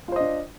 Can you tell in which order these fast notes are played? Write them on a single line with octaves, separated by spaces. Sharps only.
F4 C5 D#5 D4